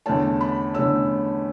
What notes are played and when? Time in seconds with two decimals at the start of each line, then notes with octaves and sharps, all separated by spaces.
0.06 E2 D3 A3 C#4 A5
0.41 B5
0.75 E2 D3 A3 C#4 E6